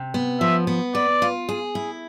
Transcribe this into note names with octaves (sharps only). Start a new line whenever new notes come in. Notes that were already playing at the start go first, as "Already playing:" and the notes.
Already playing: C3
B3
F3 E5
B3
B4 D5
F4
G#4
E4